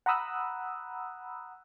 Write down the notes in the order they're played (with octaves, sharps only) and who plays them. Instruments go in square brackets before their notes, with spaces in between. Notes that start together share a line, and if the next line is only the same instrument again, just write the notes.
[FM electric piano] F#5 A#5 B5 D#6 E6 F#6